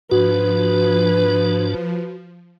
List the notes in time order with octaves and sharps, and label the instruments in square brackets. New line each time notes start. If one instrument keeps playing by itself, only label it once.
[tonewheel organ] G#2 D4 [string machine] F3 [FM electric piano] F#4 [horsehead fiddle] B4